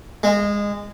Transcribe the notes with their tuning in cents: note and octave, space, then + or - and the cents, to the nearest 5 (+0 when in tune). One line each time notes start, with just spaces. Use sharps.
G#3 -20